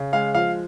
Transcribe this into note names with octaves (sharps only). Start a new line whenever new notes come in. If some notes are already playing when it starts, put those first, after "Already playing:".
Already playing: C#3
G#3 F5
F3 F5